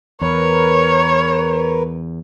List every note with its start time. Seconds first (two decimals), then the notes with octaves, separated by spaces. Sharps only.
0.21 E2 A#4 B4 C#5